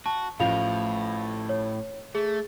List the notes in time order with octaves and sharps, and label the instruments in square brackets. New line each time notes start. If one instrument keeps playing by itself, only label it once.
[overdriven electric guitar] F#4 [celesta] A5
[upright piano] A1 F3 [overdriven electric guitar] A2 [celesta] F5 F7
[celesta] C#5
[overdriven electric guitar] A3 [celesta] G#4